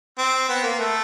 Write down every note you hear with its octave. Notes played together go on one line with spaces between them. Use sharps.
C4
B3
A#3
A3